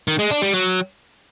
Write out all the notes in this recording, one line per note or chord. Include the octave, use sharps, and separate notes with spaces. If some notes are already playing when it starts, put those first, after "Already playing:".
D#3
G#3
D4
G3
F#3